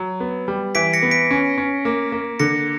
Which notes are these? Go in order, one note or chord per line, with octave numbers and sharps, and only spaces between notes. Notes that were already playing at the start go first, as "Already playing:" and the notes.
Already playing: F#3
B3
G3
E3 B6 D7
A#6 C#7
B3
B6 D7
C#4
C#4
A#3
A#3
D3 A#6 C#7